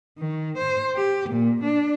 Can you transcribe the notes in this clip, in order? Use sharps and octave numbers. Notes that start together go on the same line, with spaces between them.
D#3
C5
G4
A#2
D4